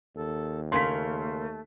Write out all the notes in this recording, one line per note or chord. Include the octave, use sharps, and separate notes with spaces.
D#2 A4
C#3 A3 A#3 C6 B6